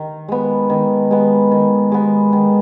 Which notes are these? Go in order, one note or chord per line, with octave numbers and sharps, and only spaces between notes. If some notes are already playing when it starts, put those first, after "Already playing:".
Already playing: D#3
G#3 B3
D#3
G#3 B3
D#3
G#3 B3
D#3